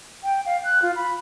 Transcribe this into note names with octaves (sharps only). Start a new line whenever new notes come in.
G5
F5
F#6
F4
B5